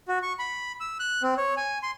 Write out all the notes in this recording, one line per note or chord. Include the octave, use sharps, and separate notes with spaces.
F#4
C#6
B5
E6
F#6
C4
C#5
G#5
C6